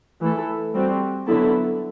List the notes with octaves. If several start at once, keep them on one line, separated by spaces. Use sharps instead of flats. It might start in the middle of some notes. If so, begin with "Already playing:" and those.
E3 A3 E4 A4
G3 C4 F#4
D3 F#3 B3 E4 A4